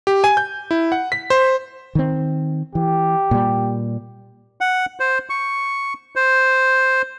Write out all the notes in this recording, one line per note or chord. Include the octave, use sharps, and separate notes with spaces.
G4
G#5
G6
E4
F#5
B6
C5
D#3 C4
E3 G4
A#2 G3
F#5
C5
C#6
C5